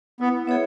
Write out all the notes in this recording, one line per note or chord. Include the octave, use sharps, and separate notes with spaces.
B3 E4
B3 G#4 C#5 E5